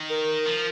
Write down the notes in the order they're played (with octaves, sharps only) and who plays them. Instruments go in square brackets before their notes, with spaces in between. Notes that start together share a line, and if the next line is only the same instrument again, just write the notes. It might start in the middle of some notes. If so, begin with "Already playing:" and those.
Already playing: [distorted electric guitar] D#3
[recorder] A#4
[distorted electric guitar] F3